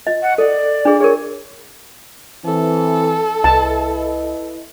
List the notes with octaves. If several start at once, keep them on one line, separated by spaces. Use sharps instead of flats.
D#5
F#5
A4 D5
D4 G#4
G#4 A#4 C#5
E3 C4 A4
C2 E4 B4 D#5 A5